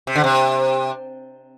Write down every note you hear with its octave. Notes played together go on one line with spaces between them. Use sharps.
C3
D3
C3